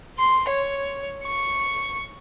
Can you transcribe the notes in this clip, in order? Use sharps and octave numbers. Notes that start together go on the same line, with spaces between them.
C6
C#5
C#6